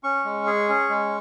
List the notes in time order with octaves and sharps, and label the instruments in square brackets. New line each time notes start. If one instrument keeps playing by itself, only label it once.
[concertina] C#4 C#6
G#3
G#4
C#4
G#3